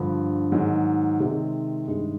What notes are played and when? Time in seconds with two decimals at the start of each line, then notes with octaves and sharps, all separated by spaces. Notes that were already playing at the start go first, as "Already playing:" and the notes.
Already playing: G2 D3 F3
0.52 G#2 D#3 F#3
1.20 C3 D#3 G#3
1.87 G2 D#3 G#3